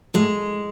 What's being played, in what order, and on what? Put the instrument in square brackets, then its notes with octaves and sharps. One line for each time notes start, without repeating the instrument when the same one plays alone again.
[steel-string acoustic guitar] A2 G#3